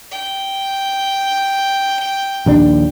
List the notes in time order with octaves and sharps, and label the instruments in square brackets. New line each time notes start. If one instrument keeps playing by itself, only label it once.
[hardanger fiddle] G5
[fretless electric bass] A#1 D#2 D4